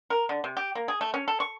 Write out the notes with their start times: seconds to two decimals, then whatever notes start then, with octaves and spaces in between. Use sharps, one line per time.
0.10 A#4
0.29 D3
0.44 C3
0.57 G4
0.75 A#3
0.88 G#4
1.01 A3
1.14 C#4
1.28 A4
1.40 C#6